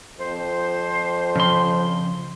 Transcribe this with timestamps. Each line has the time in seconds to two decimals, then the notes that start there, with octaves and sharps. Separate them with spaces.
0.18 F2 C5
1.36 C#3 F3 C6